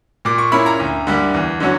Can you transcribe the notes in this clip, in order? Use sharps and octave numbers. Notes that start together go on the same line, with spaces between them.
A#2 D6
C#6
A#3 C#4 E4 B5
A#5
D2
D3 G3 A#3
E2
D3 F#3 C#4